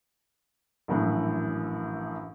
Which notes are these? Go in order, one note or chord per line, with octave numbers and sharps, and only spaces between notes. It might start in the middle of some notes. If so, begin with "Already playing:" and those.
A#1 F#2 A2 E3